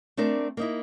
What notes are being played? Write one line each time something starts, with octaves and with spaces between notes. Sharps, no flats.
A3 C4 D4 A#4 D5
A#3 D#4 E4